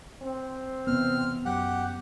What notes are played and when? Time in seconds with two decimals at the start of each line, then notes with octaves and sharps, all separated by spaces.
0.22 C4
0.87 E2 C3 B3 F6
1.46 F#2 G4 F#5